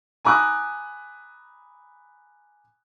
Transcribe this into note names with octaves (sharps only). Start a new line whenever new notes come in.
G#5 A#5 B5 D6 D#6 F#6